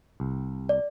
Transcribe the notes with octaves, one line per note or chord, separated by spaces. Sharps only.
C2
D5